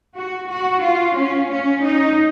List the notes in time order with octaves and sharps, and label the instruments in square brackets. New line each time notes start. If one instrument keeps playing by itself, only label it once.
[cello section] F#4
F#4
F4
C#4
C#4
D#4